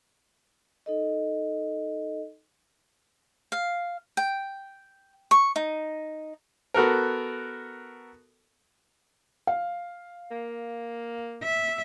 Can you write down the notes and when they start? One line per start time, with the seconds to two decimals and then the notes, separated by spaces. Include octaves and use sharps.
0.86 D#4 A4 D#5
3.52 F5
4.17 G5
5.31 C#6
5.56 D#4
6.74 B3 F#4 A4 A#4
9.47 F5
10.31 A#3
11.44 E5